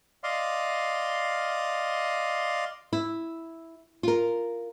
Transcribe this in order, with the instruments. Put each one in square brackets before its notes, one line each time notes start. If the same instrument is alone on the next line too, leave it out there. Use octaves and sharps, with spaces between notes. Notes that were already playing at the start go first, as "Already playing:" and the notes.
[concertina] D5 D#5 F5 C6
[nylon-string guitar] E4
F4 A#4